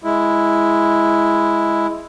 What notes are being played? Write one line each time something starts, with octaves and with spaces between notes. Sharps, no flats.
G#3 E4